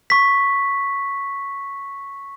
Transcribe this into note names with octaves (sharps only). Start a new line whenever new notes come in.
C#6 B6